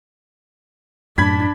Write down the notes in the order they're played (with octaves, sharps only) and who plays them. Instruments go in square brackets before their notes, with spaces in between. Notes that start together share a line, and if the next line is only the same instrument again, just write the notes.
[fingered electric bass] F#2 A2 [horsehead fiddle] D4 [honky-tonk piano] B5 G#6 B6